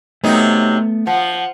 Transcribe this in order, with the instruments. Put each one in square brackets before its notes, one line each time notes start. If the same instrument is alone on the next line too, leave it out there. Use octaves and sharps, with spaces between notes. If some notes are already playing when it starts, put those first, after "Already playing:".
[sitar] C3 F#3 D#4 [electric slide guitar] A3 B3
[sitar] F3 [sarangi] F#5